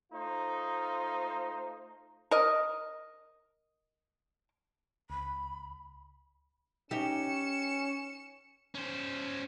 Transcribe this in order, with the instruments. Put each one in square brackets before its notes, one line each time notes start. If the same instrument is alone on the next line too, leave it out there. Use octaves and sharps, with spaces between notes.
[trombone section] A3 D#4 F4 C5
[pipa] A#4 D#5
[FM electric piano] C#2 [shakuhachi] B5
[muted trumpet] C#4 [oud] D#4 G4 [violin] C#7 E7
[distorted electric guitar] C#4 C5